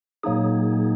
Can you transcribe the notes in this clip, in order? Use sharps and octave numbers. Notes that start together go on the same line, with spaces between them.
A#2 F#3 A#3 D#4 G#4